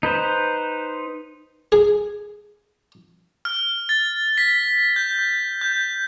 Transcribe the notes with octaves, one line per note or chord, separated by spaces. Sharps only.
D#4 B4 C5
G#4
F6
A6
B6
G6
G6
G6